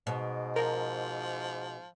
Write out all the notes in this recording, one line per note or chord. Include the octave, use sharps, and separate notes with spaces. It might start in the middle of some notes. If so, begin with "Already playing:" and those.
G#2 B2
F3 A#4